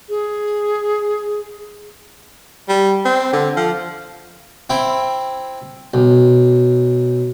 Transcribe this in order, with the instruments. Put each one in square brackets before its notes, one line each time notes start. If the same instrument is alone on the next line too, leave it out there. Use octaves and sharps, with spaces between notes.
[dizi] G#4
[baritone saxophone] G3
C4
D3
F3
[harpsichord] C4 E4 G5
B1